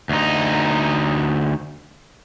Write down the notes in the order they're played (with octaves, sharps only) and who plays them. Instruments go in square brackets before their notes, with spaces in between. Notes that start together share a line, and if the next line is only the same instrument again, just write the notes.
[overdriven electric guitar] D2 D#4